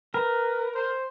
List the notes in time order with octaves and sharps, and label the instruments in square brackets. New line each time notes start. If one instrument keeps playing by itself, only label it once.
[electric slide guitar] A#4 [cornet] B4
[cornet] C5